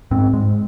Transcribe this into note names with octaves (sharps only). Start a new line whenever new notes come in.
G#2 C4
G#2 G#3